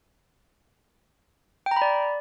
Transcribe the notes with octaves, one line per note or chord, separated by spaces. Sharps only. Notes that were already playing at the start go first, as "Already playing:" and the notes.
G5
A#5
B5
D5